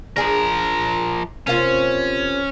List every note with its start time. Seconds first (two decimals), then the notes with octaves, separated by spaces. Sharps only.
0.16 F3 D4 G#4 A#4
1.47 C3 A#3 C#4 F4